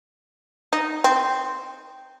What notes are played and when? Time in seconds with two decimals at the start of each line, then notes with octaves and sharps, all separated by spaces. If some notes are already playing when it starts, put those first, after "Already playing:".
0.73 D#4
1.04 C4